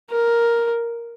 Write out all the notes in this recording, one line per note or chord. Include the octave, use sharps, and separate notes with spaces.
A#4